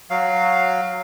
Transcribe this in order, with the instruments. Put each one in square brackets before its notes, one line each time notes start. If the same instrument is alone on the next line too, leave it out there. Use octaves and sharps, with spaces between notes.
[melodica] F#3 F5